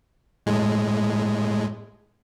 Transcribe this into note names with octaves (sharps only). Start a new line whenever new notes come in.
A2 G#3